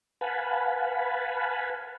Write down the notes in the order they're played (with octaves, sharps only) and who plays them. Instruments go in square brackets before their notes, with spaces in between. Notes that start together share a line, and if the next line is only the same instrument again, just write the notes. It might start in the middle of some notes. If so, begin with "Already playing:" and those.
[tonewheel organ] B4 F5 F#5 G#5 A5 B5